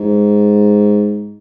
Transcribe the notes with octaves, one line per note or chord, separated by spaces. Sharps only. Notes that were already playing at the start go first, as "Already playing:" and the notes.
Already playing: G#2